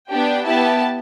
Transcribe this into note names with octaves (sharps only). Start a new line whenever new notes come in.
B3 D4 G4 G5
B3 E4 G4 A5